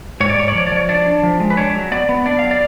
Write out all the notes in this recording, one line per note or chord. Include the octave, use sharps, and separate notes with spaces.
G#2 C#5
D5
G#2 C#5
D5
F3 C#5
D5
F3 C#5
D4 D5
D4
F3
G#3
B4
D4 C#5
F#3
B3 D5
B3
D4 D5
F#3 F5
D5